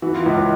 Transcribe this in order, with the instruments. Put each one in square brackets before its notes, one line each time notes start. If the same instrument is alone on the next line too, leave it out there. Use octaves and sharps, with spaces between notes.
[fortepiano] E3 [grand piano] F#4
[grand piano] F4
[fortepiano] C#2 [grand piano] E4